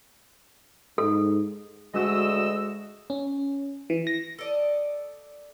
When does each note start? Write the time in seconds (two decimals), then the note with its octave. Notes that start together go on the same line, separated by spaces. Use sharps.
0.98 G#2 A4
1.94 D2 G#3 F#4 D#5 E6
3.10 C#4
3.90 E3
4.07 A#6
4.39 A4 D5 D#5